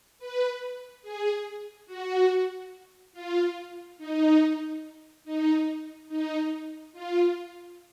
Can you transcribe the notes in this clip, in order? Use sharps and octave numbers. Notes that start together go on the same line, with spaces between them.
B4
G#4
F#4
F4
D#4
D#4
D#4
F4